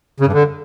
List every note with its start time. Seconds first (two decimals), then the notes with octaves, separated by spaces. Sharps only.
0.20 C#3
0.26 G2
0.33 D3